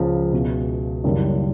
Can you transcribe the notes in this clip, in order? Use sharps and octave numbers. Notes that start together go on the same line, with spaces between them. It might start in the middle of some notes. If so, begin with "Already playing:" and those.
Already playing: C#2 C#3 F3
C#2 B2 G#3 C#4 E4
F#1 F#2 D#3 G3 A#3